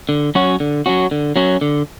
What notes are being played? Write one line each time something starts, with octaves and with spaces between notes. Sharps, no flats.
D3
F#3 C#4 F#4
D3
F#3 C#4 F#4
D3
F#3 C#4 F#4
D3